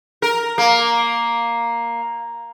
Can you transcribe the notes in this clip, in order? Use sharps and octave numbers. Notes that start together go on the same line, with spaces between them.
A#4
A#3